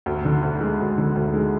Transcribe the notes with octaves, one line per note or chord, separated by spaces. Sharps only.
D2
D3
D2
G#3
D2
D3
D2
G#3